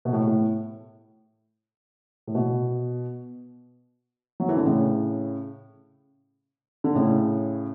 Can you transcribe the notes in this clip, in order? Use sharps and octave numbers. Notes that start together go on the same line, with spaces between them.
B2
A2
A2
A2
B2
F#3
E3
D3
A2 C#3
D3
A2 C#3